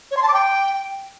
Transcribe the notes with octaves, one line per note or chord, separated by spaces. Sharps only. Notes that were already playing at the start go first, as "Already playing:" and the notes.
C#5
C6
A5
D6
G5